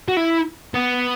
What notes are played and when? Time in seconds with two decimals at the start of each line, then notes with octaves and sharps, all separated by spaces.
0.08 F#4
0.17 E4
0.74 B3